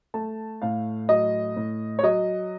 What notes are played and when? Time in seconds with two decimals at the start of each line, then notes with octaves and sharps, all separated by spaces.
0.14 A3 A5
0.62 A2 F5
1.09 F#3 D#5
1.56 A2
1.99 C#5
2.03 F#3 D#5